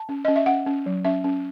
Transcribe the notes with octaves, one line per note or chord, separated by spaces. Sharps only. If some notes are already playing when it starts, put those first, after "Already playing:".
Already playing: A5
C#4
C#4 D#5
E5
C#4 F#5
C#4
F#3
C#4 E5
C#4